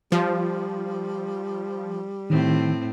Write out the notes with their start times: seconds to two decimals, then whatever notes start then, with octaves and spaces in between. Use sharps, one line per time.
0.12 F3 G3
2.30 A2 D#3 C4